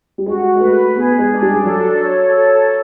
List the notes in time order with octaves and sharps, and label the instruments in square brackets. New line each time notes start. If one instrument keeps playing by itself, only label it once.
[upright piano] G3
[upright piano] G#3 [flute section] F#4
[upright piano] G#3
[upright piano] A3 [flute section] B4
[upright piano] B3 [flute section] G#4
[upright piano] G#3
[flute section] D4
[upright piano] G3
[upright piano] F#3 [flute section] A4
[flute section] C#5
A4